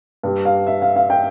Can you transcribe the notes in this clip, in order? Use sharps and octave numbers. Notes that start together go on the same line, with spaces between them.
G2 G3
F5
E5
F5
F5
G5